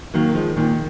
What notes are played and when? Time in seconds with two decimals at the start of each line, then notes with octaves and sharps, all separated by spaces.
0.14 D#3 F#3 A#3
0.35 F3 G#3
0.56 A#2 D#3